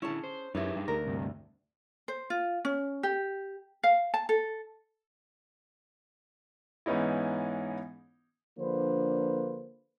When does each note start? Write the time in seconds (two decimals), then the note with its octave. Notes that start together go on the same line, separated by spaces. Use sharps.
0.02 D3 C#4 E4 G#4 A5
0.24 C5
0.55 F#2 D#4 E4 G4 G#4 B4
0.76 G2
0.88 D2 A#4
1.06 G2 C3
2.08 C5
2.30 F4
2.65 C#4
3.03 G4
3.83 F5
4.14 A5
4.29 A4
6.86 G#2 E3 B3 C#4 D#4 E4
8.59 D3 F3 A#3 D4 B4 C5